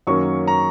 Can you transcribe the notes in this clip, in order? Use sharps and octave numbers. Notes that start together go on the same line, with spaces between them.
F#2 D#3 F#3 A#3 C#4 C#6
A#5